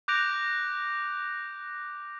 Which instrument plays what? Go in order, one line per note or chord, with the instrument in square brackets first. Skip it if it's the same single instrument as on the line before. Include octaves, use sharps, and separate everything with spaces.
[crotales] D6 F#6 G6 A#6 D7 F7